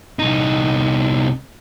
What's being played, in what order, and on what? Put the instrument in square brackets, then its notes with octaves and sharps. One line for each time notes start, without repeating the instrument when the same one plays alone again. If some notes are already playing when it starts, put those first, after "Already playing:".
[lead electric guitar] C2 D#4